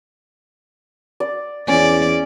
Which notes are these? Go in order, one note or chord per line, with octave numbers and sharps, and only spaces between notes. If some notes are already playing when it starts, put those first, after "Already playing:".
D5
E2 C#4 D5